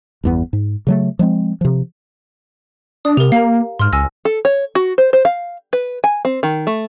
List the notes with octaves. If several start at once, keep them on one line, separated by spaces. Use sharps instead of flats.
G1 E2 B3
G#2
C#3 F#3 A3
F3 G#3 C4
C3 F3
D4 D#6
C3 G4 A#4
A#3 F5 A#5
G#2 C6 F6
C#2 G#5 E6 A#6
A4
C#5
F#4
C5
C5
F5
B4
G#5
C4
D#3
A3